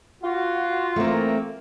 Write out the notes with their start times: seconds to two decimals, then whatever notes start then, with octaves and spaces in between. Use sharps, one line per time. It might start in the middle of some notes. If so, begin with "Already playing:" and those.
0.23 F4 F#4
0.96 E3 A3 A#3 C4